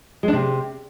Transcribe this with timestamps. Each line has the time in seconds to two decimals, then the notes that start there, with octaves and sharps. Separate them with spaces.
0.23 G#3
0.28 D4
0.33 C3